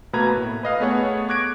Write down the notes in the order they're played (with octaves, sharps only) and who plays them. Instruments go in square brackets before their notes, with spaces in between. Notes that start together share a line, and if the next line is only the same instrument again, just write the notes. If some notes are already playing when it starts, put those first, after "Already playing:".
[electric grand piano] B2 A3 A#3 B4 A#5 G#6
A2
B4 D#5 F5
A3 B3 G#4 C#5 F#5
C#6 D6 F#6 G#6 A#6 D7